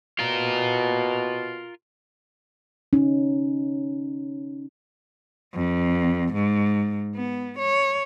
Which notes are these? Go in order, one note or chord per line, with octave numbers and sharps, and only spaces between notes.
B2 F4 A#4
C#4 D#4
F2
G#2
B3
C#5